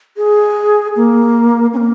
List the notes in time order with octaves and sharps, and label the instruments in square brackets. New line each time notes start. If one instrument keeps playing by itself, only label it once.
[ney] G#4
A#3
C#4
A#3